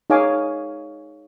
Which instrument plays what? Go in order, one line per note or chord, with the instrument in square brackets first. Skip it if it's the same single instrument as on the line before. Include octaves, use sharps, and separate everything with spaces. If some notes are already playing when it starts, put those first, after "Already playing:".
[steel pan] D#4 G#4 C#5 F5 G#5 D6